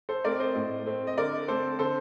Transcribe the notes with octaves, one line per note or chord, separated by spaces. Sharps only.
A4 C5
A3 C4 A#4 D5
C5 D#5
A2
A3 C4
D#5
D3 A#4 D5
A3 C4 A4 C5
D3 A4 C5